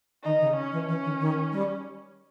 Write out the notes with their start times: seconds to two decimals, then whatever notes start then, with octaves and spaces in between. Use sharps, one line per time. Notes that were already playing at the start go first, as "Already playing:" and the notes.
0.23 D#3 D#4
0.41 C#3
0.56 C#4
0.72 E3
0.88 E3 C#4
1.03 D#3
1.20 D#3
1.52 G3